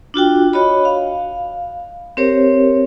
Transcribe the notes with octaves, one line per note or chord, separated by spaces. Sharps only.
D4 F4 F#4 G5
F#4 C#5 D#5 B5
F5
C4 G4 A#4 C5 C#5